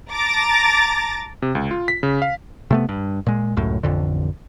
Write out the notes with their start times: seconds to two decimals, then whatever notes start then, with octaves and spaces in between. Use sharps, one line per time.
0.12 A5 A#5 D6 A6 A#6
1.42 C3
1.55 C#2
1.71 F4
1.88 B6
2.03 C#3
2.22 F5
2.71 C3 A3 B3
2.89 G2
3.27 A#2 G#3
3.57 C#2 F#2 A2
3.83 A1 F2 D3